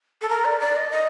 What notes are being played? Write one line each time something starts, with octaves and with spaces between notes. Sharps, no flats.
A4
A#4
D5
D5
D#5
D#5